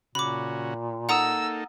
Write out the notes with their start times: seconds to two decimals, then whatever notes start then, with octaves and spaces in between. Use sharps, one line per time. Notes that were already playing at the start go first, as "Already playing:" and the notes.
0.15 A#2 C#3 F#4 B5 D6
1.09 A#3 D#4 A4 F#5 A#5 D#6 E6